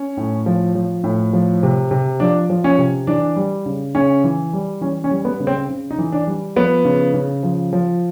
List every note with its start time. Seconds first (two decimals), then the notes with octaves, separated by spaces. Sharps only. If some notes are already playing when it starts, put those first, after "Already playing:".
Already playing: C#4
0.17 A2
0.46 F3
0.75 F3
1.04 A2
1.33 F3
1.63 C3
1.91 C3
2.20 F3 D4
2.50 F3
2.64 C#4
2.78 C3
3.07 E3 D4
3.36 G3
3.66 C#3
3.95 C#3 C#4
4.24 E3
4.53 G3
4.81 E3 C#4
5.04 C#4
5.11 G3
5.25 B3
5.40 C#3
5.47 C4
5.69 C#3
5.91 D#4
5.98 E3
6.12 D4
6.27 G3
6.56 F3 B3
6.85 C#3
7.14 C#3
7.43 F3
7.73 F3